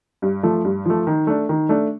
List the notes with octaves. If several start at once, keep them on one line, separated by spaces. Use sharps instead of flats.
G2
F3 A3
G2
F3 A3
D#3
A3 D4
D#3
A3 D4